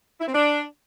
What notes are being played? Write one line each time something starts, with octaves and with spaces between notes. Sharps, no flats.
E4
C4
D4